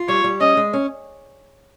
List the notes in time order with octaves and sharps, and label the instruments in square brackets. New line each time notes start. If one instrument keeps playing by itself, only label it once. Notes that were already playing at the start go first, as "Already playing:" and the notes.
Already playing: [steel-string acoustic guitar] F4
[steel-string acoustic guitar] G3 [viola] C#5
[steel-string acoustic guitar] G3
[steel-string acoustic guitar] C#4 [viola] D#5
[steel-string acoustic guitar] G#3
C#4